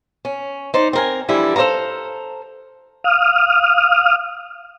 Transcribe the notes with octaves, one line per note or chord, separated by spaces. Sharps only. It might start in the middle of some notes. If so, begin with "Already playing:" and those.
C#4
D#4 C5 D5
C4 A#4 G#5
D3 E3 F3 G3 D4 E4
A4 C5 D5 F5 A#5
F5 D#6 F6